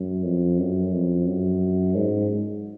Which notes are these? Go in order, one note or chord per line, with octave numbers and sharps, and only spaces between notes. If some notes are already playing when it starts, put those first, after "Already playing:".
Already playing: F#2
F2
F#2
F2
F#2
G#2